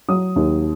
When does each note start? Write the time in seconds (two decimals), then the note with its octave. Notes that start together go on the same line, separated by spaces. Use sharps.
0.09 F#3 D#6
0.36 D#2